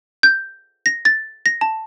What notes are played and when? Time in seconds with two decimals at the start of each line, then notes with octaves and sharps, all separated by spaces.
0.23 G6
0.86 A#6
1.05 A6
1.46 A#6
1.61 A5